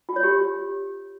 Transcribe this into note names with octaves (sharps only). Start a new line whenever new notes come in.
F4
C#5
G4